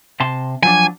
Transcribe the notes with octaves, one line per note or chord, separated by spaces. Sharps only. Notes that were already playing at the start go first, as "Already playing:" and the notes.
C3 A5 C6
F3 F#3 D4 G#5